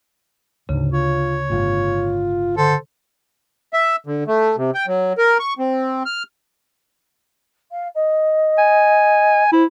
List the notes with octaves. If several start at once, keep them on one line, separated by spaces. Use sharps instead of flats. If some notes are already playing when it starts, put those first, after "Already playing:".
D2 G#2 C#3
F4 C#5
G1 A2 F4
D3 A4 C5
E5
D3
A3
C3
G5
F#3
A#4
C#6
C4
F6
F5
D#5
G#5
E4 C5